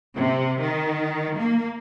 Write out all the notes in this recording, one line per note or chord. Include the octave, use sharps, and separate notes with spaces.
C3
D#3
A#3